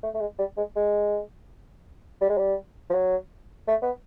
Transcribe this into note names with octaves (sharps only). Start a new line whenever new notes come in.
A3
A3
G#3
G3
G#3
G#3
G3
G#3
G3
F3
F#3
A3
B3